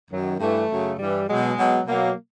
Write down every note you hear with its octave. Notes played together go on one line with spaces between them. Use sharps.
F#2 D#3 F#3
G2 E3 A3
F#2 C#3 F#3
G2 E3 G3
B2 F#3 G#3
B2 F#3
B2 F#3 A#3